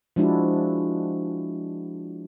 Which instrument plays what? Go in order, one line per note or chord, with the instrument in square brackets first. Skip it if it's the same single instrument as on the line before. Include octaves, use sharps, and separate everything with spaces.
[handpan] F3 G#3 D4 E4 F#4